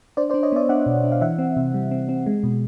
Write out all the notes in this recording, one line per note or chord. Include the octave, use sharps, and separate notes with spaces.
D4 C5 D5
C5 D5
D4
C#5 D#5
B3 D5 E5
D4 E5 F#5
B2
D4
F5
E3 E5 F#5
C4
C3
G3
C4
C4
G#3
B2